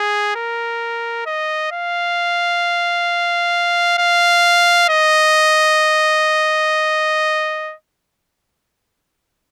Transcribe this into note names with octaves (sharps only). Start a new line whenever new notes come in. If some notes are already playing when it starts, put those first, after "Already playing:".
Already playing: G#4
A#4
D#5
F5
F5
D#5